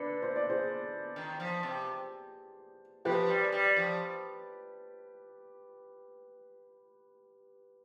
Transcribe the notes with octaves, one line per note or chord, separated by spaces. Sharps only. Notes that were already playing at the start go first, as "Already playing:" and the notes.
Already playing: D3 B4 D5
C5
D5
G#4 C5
D#3
F3
C3
F3 G4 B4
G3
G#3
G3
F3